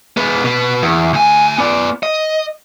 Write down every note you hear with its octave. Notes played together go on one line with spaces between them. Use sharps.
G#3 B3
B2 B3
E2
D2 G#5
B3 D5
D#5